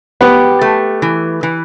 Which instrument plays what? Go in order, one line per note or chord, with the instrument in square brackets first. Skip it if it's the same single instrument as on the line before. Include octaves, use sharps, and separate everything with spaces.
[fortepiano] B3 [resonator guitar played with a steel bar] G4
[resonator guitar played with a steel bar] A3
E3
E3